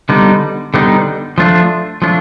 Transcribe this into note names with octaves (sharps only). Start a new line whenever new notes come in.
D3 G3 B3 D#4
D3 G3 B3 D#4
F3 A3 D4 F4
F3 A3 D4 F4